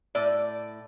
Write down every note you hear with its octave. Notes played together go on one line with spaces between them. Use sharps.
A2 D5